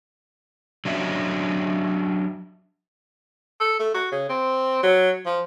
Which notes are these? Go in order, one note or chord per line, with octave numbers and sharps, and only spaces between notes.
F#3 C#4 D4 D#5 E5
A4
A3
F#4
C#3
C4
F#3
F3